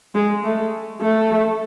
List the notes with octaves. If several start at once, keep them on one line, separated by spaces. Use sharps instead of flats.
G#3
A3
A3